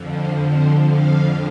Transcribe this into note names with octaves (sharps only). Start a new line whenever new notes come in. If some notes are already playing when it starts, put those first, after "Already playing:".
Already playing: F2 D3 F3
C5
C5
F5